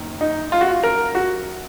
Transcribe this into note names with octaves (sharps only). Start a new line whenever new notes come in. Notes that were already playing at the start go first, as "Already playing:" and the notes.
Already playing: F#1 F#2 D#3
D#4
F4
F#4
F4
A#4
F#4